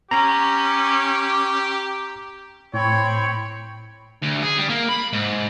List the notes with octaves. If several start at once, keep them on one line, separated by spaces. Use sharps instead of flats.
C#4 G4 A#5
A2 C4 C#5 G5 B5
D2
G#4
G3
A#3
B5
G#2